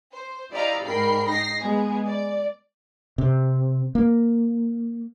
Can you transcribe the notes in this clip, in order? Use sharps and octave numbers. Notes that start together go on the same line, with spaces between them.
C5
E4 G4 D5 D#5 F5 A#5
G#2 A#4 G5 B5 C7
D#4 A#6 C7
G#3 B3 G#4
D5
C3
A#3